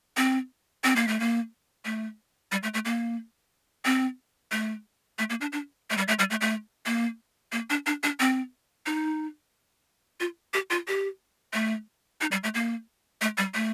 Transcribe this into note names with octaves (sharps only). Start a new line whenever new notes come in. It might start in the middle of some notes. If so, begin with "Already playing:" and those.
C4
C4
A#3
A3
A#3
A3
G3
A3
A3
A#3
C4
A3
A3
A#3
D4
D4
A3
G3
A3
G3
A3
A3
A#3
A#3
D4
D4
D4
C4
D#4
F4
G4
F4
G4
A3
D#4
G3
A3
A#3
A3
G3
A3